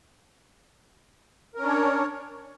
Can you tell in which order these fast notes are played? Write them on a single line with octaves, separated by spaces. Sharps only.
A#4 C#4 D4 C#5